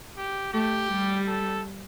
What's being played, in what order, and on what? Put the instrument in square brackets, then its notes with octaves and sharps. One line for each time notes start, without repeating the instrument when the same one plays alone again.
[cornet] G4
[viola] A3 [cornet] G4
[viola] G3
[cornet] A4